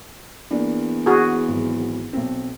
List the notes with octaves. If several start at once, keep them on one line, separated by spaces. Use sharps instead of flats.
E2 A#3 D4 D5
F#4 G#4
G#1 F#3
B1 C4